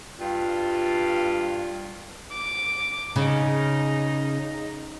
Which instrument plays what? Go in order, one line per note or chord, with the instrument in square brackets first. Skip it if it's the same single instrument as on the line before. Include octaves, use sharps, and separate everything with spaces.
[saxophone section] G2 G3 F4
[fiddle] D6
[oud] C#3 [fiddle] D#4